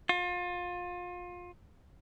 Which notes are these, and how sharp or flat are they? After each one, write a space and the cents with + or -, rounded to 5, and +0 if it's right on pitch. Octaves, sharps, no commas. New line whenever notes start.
F4 +30